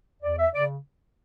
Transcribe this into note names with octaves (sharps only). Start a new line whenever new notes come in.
E2 D5
E5
C#3 D5